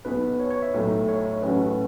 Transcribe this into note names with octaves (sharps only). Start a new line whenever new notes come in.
B1 B2 B3 B4
C#5
C#5
E5
B1 A2 F#3 A3
C#5
A1 A2 F#3 C#4 F#4 B4